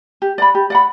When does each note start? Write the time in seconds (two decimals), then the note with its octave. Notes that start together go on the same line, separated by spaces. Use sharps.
0.22 G4
0.38 D5 F#5 B5
0.55 G4
0.70 D5 F#5 B5